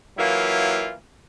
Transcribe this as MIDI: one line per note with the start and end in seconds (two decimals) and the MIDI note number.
0.17 0.93 52
0.17 0.93 54
0.17 0.93 58
0.17 0.93 64
0.17 0.93 65